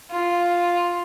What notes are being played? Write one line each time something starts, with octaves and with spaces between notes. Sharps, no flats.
F4